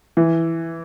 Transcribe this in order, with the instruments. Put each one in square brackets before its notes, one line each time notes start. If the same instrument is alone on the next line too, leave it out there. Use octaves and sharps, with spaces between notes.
[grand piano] E3